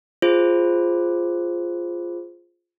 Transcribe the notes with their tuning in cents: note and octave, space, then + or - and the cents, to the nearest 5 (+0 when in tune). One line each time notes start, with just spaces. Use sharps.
F4 +0 G#4 +0 C5 +0